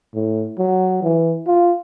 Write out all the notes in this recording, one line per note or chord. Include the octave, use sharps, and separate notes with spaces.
A2
F#3
E3
F4